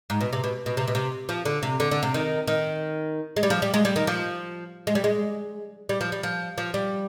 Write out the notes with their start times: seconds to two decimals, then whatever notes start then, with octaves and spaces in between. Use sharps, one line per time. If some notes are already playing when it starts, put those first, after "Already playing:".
0.10 G#2
0.21 B2
0.33 C3
0.44 B2
0.66 B2
0.77 C3
0.88 B2
0.95 C3
1.29 F3
1.45 D3
1.63 C3
1.80 D3
1.91 D3
2.03 C3
2.14 D#3
2.48 D#3
3.36 G#3
3.43 G3
3.50 F3
3.62 G3
3.74 G#3
3.85 G3
3.96 D#3
4.07 F3
4.87 G#3
4.95 G3
5.04 G#3
5.89 G3
6.01 F3
6.12 G3
6.23 F3
6.58 F3
6.74 G3